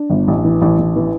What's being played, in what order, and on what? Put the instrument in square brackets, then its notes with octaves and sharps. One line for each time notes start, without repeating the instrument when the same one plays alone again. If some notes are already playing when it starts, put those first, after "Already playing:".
Already playing: [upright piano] D4
G1
A1
E3
A1
A1
E3